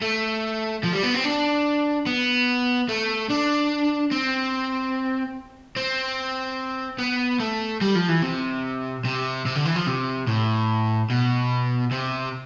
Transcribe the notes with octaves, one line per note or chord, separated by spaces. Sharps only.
A3
F3
G3
B3
C4
D4
B3
A3
D4
C4
C4
B3
A3
G3
F3
E3
C3
C3
C3
D3
E3
F3
C3
A2
B2
C3